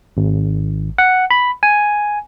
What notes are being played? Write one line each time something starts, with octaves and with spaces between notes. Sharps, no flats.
G#1
F#5
B5
G#5